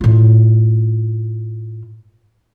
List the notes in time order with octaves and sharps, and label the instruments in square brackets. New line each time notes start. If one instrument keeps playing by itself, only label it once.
[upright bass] A2 F4